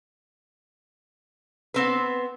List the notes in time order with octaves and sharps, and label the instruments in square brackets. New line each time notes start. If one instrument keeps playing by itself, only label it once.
[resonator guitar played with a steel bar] B3 C4 B4